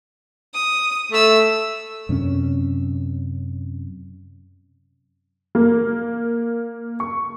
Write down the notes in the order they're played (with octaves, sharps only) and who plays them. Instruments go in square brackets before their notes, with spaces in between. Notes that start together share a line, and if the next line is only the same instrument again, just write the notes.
[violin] D#6
[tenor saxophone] A3 [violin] E5 E6
[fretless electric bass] F#2 C3 C4 C#4
[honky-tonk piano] A#3
C#6